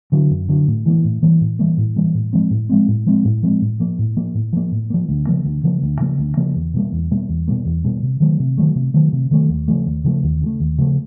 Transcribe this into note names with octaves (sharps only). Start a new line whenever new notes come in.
D3 F#3
F#2
D3 F#3
A2
E3 G3 A#3
A2
E3 G3 A#3
A2
E3 G3 A#3
A2
E3 G3 A#3
A2
F3 G#3 C4
A2
F3 G#3 C4
A2
F3 G#3 C4
A2
F3 G#3 C4
A2
F3 A#3
A2
F3 A#3
A2
F3 A#3
A2
F3 A#3
D2
C#3 F3 A#3
D2
C#3 F3 A#3
D2
C#3 F3 A#3
D2
C#3 F3 A#3
E2
B2 G3 A#3
E2
B2 G3 A#3
E2
B2 G3 A#3
E2
B2 G3 A#3
C3
D#3 F#3 A3
C3
D#3 F#3 A3
C3
D#3 F#3 A3
C3
D#3 F#3 A3
D#2
C#3 F3 A3
D#2
C#3 F3 A3
D#2
C#3 F3 A3
D#2
C#3 F3 A3